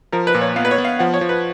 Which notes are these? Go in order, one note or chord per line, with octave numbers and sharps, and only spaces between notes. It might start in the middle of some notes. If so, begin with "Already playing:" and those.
F3 A#4
B4
A#2
C#5
B3 F5
B4
C#5
B3
F5
F3 F#5
C#5
F3
B4